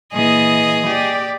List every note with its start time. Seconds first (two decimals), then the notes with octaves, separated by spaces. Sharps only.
0.13 A#2 E3 G#4 D#5
0.87 G4 D5